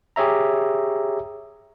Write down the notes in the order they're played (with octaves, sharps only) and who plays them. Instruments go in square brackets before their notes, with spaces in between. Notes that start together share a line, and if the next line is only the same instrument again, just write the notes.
[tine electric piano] G4 G#4 C#5 E5 A#5